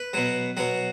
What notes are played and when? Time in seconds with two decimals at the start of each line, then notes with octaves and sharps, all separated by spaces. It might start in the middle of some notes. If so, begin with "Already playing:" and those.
Already playing: B4
0.13 B2 F#3
0.57 B2 F#3